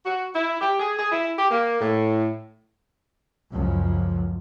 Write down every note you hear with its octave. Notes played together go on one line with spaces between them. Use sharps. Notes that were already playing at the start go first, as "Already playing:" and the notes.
F#4
E4
G4
G#4
G#4
E4
G4
A#3
A2
C#2 F#2 F3